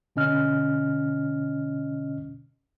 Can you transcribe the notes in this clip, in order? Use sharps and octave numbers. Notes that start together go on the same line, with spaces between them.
B2 D3 C#4 D#5 F6